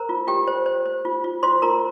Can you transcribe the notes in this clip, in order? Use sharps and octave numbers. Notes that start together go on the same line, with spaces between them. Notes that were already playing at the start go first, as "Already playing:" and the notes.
Already playing: A#4 C5 A#5
F4
F4 G4 G5
C5
C5
C5
F4
F4
F4 C5 C6
F4 A#4 A#5